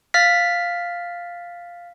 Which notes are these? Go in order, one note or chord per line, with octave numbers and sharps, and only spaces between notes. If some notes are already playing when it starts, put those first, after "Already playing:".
F5 F6 A6 B6